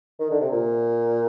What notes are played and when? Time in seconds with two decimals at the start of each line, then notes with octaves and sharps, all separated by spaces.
0.20 D#3
0.31 D3
0.41 C3
0.51 A#2